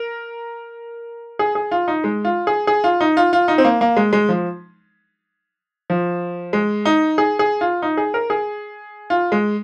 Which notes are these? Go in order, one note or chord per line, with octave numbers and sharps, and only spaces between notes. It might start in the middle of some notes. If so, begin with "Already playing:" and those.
Already playing: A#4
G#4
G#4
F4
D#4
G#3
F4
G#4
G#4
F4
D#4
F4
F4
D#4
C4
A#3
A#3
G#3
G#3
F3
F3
G#3
D#4
G#4
G#4
F4
D#4
G#4
A#4
G#4
F4
G#3